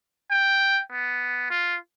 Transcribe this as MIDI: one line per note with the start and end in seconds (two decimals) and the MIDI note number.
0.31 0.82 79
0.91 1.47 59
1.50 1.77 65